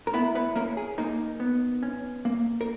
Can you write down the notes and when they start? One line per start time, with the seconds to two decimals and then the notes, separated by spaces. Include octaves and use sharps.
0.07 A#4
0.13 B3 E4 B4
0.35 B3 B4
0.56 A#3 C#4 A#4
0.77 G#4
0.98 A#3 D#4 A#4
1.40 B3
1.83 C#4
2.25 A#3
2.61 A#4